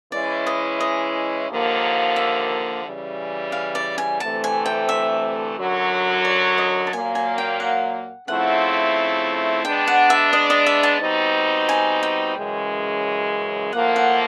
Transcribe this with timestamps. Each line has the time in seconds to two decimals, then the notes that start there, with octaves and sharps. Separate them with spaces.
0.12 E3 G#3 C#4 E4 D5
0.47 D#5
0.81 D#5
1.49 D#2 D3 F3 A#3
2.16 E5
2.84 C#3 E3 G3
3.52 F5
3.75 D5
3.98 G#5
4.20 D2 C3 E3 A3 C4 A5
4.44 G#5
4.66 G5
4.89 E5
5.56 F#2 D3 F#3
6.25 D5
6.58 D#5
6.87 A5
6.93 A#2 F#3 A#3 G#5
7.15 G#5
7.38 G5
7.60 F#5
8.28 C#3 F3 A3 C4 E4 F#5
9.64 G#3 B3 D4 G5
9.87 F#5
10.10 E5
10.33 D#5
10.50 D#5
10.67 E5
10.83 A5
11.01 B2 G3 C4 D#4
11.69 G#5
12.03 G5
12.37 F#2 C#3 E3 G#3
13.73 A2 F3 A#3 F#5
13.96 F#5